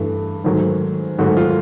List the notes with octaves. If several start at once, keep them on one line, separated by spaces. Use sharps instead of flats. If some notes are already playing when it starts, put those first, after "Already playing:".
Already playing: G2 E3 A3
G#2 D#3 F#3 A3
G#2 D#3 F#3 A3 F#4
F4